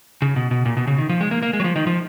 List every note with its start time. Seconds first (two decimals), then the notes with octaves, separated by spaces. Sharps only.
0.22 C#3
0.36 B2
0.51 B2
0.65 A#2
0.77 B2
0.87 C#3
0.98 D#3
1.09 F3
1.21 G#3
1.31 A#3
1.43 A#3
1.53 G#3
1.60 F#3
1.64 F3
1.76 D#3
1.87 F3